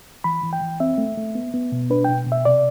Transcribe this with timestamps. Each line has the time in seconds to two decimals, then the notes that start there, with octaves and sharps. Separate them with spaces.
0.24 E3 B5
0.43 E3
0.53 G5
0.61 E3
0.80 C4 E5
0.98 A3
1.17 A3
1.35 B3
1.54 B3
1.72 B2
1.90 D4 B4
2.05 B2 G5
2.27 B2
2.32 E5
2.45 C3 D5